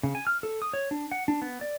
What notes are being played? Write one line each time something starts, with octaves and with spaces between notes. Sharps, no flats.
C#3
G#5
F6
A4
D#6
C#5
D4
F#5
D4
B3
D5